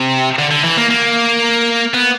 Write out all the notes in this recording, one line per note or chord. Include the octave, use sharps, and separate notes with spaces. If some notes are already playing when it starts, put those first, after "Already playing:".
Already playing: C3
D3
D3
E3
A#3
A#3
B3